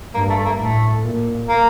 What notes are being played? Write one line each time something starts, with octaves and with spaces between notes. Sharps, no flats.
G2 A#3
A3
A3
A#3
A2 A3
A#2
A#3